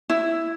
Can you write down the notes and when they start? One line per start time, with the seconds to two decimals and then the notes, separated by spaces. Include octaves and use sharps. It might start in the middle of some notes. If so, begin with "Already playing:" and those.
0.10 E4